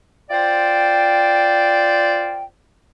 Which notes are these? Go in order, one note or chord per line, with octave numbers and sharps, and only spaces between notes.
F4 C5 D5 G5